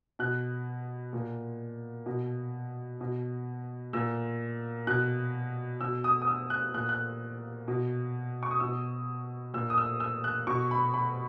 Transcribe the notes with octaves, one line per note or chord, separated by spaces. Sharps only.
B2 F#6
A#2
B2
B2
A#2 E6
B2 F#6
B2 E6
D#6
D#6
E6
F#6
A#2 F#6
F#6
B2
C#6
D#6
B2 E6
A#2 E6
D#6
E6
E6
F#6
B2 C#6
B5
B5